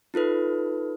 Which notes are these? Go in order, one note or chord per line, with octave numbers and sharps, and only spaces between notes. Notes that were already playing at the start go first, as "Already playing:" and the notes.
D#4 F4 A4 B4